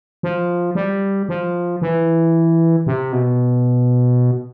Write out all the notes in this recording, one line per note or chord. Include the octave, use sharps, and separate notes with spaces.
F3
G3
F3
E3
C3
B2